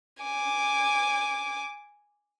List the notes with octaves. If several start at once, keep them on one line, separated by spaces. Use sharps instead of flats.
G#5 D6